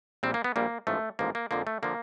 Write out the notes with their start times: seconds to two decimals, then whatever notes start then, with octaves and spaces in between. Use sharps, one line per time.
0.23 A#1 A#2 G3 C4
0.34 A#3
0.44 B3
0.56 A#1 A#2 G3 A#3
0.87 A1 G#2 F3 A3
1.19 A1 G#2 F3 A#3
1.35 A#3
1.51 F2 D3 F3 A#3
1.67 A3
1.83 D3 F3 A#3